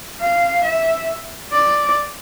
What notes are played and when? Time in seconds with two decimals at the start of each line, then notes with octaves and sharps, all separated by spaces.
0.21 F5
0.64 E5
1.53 D5